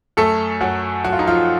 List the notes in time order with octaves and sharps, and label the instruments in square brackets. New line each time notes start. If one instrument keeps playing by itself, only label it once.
[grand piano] F#2 A3 A4
F#2 F#3 F#4
F#2 F#4
F4
D#4
F3 F4